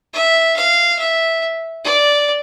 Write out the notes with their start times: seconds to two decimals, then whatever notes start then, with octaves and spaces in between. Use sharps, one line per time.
0.13 E5
0.56 F5
0.99 E5
1.84 D5